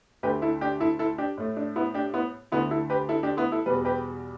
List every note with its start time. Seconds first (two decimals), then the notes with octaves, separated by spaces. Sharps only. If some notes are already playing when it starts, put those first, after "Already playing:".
0.23 D2 D3 A3 G4 B4
0.42 E4 A4
0.61 D4 G4
0.80 E4 A4
0.99 E4 A4
1.18 D4 G4
1.37 A2 A3
1.57 D4
1.76 B3 E4
1.94 D4 G4
2.14 B3 E4
2.52 D2 D3 A3 B3 E4
2.71 E4 A4
2.90 G4 B4
3.09 E4 A4
3.23 D4 G4
3.37 B3 E4
3.52 E4 A4
3.66 E2 B2 G3 B4
3.85 G4 B4